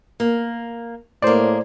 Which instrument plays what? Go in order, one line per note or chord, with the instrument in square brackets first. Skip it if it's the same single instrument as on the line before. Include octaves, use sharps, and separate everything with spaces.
[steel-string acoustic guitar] A#3
[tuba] A2 [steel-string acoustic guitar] A#3 G#4 [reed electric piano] C5 D5